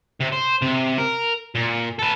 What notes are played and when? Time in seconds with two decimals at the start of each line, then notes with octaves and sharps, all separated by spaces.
0.21 C3
0.33 C5
0.62 C3
0.98 A#4
1.55 A#2
1.99 A4 B4